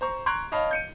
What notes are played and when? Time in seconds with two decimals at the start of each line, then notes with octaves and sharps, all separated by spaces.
0.01 C5 A#5 C#6
0.26 A#5 C6 C#6 F#6 G#6 D7
0.52 C#5 D#5 F5 A5 B5
0.71 G6 C#7 D#7